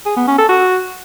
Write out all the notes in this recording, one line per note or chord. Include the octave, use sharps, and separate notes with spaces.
G#4
B3
C#4
A4
F#4